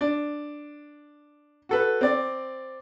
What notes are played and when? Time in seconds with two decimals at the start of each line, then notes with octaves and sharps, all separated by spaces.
0.01 D4
1.69 F#4 A4 B4
2.01 C4 D5